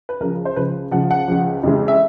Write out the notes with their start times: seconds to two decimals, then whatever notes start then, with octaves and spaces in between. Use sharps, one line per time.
0.09 B4
0.20 C#2 C#3 F3 A#4
0.45 C5
0.56 C#2 C#3 F3 B4
0.91 C#2 C#3 F3 F#5
1.11 F#5
1.28 C#2 C#3 F3
1.63 F2 C#3 E3 G#3
1.88 E5